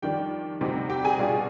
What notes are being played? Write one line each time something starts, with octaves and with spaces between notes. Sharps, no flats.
F2 D#3 G3 D4 G4 G5
D2 C3 G3 C4 D#4
G4 G5
G#4 G#5
B2 G3 D4 F4